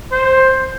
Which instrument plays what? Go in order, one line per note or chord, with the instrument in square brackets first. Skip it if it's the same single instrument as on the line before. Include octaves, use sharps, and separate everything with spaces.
[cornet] C5